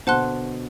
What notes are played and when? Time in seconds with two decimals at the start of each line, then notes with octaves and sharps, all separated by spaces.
0.07 B2 D3 C5 F#5 A5 C6 F#6